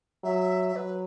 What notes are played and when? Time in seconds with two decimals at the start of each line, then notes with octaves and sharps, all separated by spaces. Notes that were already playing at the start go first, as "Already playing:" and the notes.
0.24 F#3 E5
0.76 F#3 B4